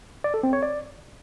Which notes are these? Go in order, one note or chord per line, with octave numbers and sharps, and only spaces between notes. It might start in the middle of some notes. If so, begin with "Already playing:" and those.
D5
A4
C4
C#5
D5